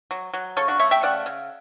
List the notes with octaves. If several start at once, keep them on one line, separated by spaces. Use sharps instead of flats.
F#3
F#3
C#3 A4 C#5
D4 F#4
A3 C#5 E5
E5 G5
C#3 D5 F#5
C#3